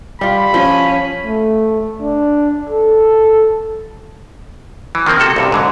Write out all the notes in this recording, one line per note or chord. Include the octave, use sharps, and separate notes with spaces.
G3 F4 B5
F3 C#4
A3
D4
A4
E3
D#3 F3 A#3 C4
C3 F#4 A4
C2 G2 C3
G#2 D3 F#3